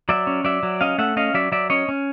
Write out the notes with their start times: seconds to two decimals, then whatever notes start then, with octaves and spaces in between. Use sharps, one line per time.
0.09 F#3 D5 E5
0.27 C#4
0.44 F#3 D5 E5
0.63 F#3
0.81 C#4 D#5 F5
0.98 A3 E5 F#5
1.17 C#4 D#5 F5
1.34 F#3 D5 E5
1.52 F#3 D5 E5
1.70 C#4 C#5 D#5
1.89 C#4